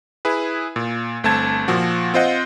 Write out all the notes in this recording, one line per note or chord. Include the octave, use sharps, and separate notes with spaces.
E4 G#4 B4
A#2
G1 A3 C4 A5 G#6
A#2 F3 F#4
C4 F4 C5 D#5 F#5